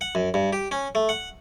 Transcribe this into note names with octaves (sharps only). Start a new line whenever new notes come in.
F#5
F#2
G2
G4
C#4
A3
F#5